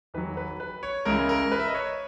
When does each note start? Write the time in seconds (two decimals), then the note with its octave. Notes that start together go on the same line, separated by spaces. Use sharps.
0.14 E2 D#3 F#3 B4
0.37 B4
0.60 B4
0.83 C#5
1.05 C#2 C#3 E3 A#4
1.29 A#4
1.52 B4
1.60 E5
1.67 D#5
1.74 C#5